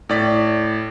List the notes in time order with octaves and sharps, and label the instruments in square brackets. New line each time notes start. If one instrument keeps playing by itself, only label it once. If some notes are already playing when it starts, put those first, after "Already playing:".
[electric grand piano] A2 D5 B6